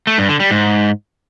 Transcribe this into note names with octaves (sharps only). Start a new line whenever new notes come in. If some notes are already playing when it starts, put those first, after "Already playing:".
A3
G2
D3
G3
G#2